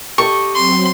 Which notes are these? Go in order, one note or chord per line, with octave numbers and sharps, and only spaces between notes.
G4 A4 D#5 C#6
F#3 C4 C6